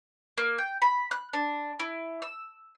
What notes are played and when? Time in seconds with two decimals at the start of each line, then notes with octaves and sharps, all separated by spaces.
0.38 A#3
0.58 G5
0.82 B5
1.11 F#6
1.33 D4
1.80 E4
2.22 E6